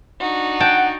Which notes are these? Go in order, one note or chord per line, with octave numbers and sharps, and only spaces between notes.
D4 D#4 F#4
F#5 G5 A5